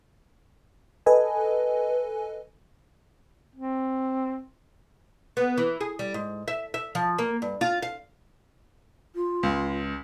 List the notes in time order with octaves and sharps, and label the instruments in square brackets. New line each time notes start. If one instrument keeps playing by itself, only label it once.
[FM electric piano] A4 B4 D#5 G#5
[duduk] C4
[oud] B3
E3
G#4
G3
G#2
E5
E5
F3
A#3
G2
F4
F5
[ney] F4
[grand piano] C#2